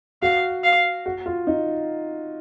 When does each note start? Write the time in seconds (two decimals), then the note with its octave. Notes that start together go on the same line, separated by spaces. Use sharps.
0.22 F#4 F5
0.64 F5
1.06 F#4
1.26 F4
1.47 D#4